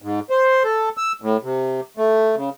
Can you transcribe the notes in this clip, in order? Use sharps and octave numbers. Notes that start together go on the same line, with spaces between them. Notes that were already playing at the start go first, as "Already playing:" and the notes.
G#2
C5
A4
E6
A2
C3
A3
C#3